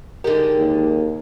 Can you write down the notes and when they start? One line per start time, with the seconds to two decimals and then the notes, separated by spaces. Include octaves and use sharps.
0.24 D3 G#3 D#4 G4 A#4
0.58 D#2